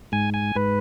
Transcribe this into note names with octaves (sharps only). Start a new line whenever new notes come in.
G#2 G#5
G#5
G#2 B4